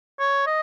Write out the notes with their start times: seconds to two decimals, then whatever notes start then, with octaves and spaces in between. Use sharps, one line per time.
0.20 C#5
0.47 D#5